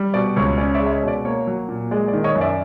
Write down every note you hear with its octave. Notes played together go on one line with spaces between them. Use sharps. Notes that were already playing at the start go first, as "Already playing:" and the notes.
Already playing: G3
B2 D5
C#2 C#5
C#4 D5
D5 E5
G#3
E5
C#5 D#5
B2 D5
A#3 C#5
F#3
A#2
G#3 D5
D5
D#3
C#5 D#5
F#2
D5 E5